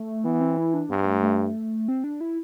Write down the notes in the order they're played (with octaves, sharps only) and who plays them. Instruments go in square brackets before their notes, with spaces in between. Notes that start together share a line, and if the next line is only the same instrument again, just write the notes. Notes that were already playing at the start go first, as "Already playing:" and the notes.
Already playing: [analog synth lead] A3
[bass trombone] E3 [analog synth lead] B3
[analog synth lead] C4
E4
D4
[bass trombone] G2 [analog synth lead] B3
[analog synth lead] A3
A3
C4
D4
E4